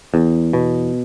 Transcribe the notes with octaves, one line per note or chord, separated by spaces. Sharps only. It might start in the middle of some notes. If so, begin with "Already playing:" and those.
E2
B2